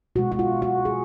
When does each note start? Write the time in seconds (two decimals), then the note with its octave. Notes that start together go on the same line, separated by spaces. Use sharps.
0.16 B2 G#3 F#4
0.32 F#4
0.39 F4
0.62 F#4
0.85 G#4